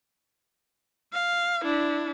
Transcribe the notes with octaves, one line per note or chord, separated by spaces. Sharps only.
F5
D4 E4